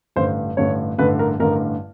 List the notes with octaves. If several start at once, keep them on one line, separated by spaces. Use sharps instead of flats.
A1 G2 D3 C5
A1 G2 D3 C#5
A1 G2 D3 B4
A#4
A1 G2 D3 A#4